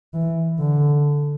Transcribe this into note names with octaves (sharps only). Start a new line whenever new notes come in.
E3
D3